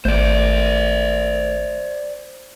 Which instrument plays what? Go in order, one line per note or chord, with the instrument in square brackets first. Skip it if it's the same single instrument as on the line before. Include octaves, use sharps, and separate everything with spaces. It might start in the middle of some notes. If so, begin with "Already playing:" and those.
[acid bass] G#1 [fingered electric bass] A3 [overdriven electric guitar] C5 D5